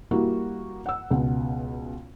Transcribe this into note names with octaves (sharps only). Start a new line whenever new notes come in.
G3 A#3 E4 F#4
F#5 E6
C#2 B2 F#5